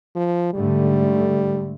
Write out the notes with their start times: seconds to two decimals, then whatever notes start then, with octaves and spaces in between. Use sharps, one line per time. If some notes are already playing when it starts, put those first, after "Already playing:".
0.16 F3
0.53 G#2 D3 G3 A3